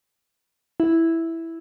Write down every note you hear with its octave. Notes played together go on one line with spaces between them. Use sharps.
E4